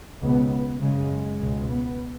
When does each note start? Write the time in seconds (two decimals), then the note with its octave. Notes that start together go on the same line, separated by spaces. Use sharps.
0.22 C#2 B2 B3
0.52 B3
0.81 F#2 C#3 G#3
1.40 C#2 B2
1.70 B3